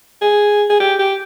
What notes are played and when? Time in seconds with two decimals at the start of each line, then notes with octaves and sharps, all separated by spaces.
0.21 G#4
0.70 G#4
0.80 G4
0.99 G4